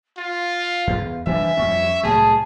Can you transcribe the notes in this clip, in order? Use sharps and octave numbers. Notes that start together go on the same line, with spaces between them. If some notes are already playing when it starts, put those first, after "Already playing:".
F4 F5
E2
E3 G3 D4 E5 G#5
F2 G3 C#4 C#6
C2 A2 F#3 G#4 A5